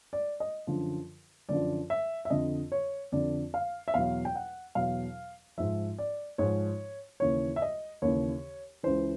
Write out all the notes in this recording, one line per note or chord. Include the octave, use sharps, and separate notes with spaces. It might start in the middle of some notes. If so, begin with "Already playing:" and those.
D5
D#5
F#2 D3 F3
F#2 D3 F3 D5
E5
E5
F2 D3 F3 D#5
C#5
F2 D3 F3 D5
F5
E5
E2 B2 F#3 F5
G5
F#5
E2 B2 F#3 F5
G#2 F3 E5
D5
G#2 F3 C#5
D#2 C#3 E3 C#5
E5
D#5
D#2 C#3 E3 C#5
C#2 C#3 E3 C5